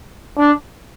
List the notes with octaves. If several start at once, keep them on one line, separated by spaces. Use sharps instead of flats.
D4